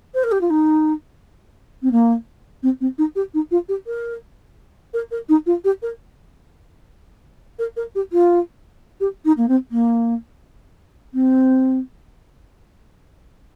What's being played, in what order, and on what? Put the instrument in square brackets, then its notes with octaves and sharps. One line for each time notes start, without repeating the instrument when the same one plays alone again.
[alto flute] C5
A#4
G4
F4
D#4
C4
A#3
C4
C4
D#4
G4
D#4
F4
G4
A#4
A#4
A#4
D#4
F4
G4
A#4
A#4
A#4
G4
F4
G4
D#4
A#3
C4
A#3
C4